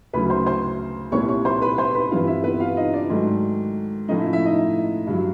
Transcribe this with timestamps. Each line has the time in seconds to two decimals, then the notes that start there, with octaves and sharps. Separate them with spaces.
0.13 D2 C#3 F#3 B4 B5
0.30 C5 C6
0.46 C5 C6
1.12 C2 A#2 G3 C4 E4 C#5 C#6
1.29 C#5 C#6
1.45 C5 C6
1.62 B4 B5
1.78 C5 C6
1.94 B4 B5
2.11 G2 E3 G3 C4 E4 F4 F5
2.27 E4 E5
2.44 B3 B4
2.60 F4 F5
2.77 D#4 D#5
2.93 D4 D5
3.10 G#2 D#3 F#3 A3
4.08 A2 F3 A3 C#4 D#4 D#5
4.21 E4 E5
4.33 E4 E5
4.46 D#4 D#5
5.07 G2 D3 F#3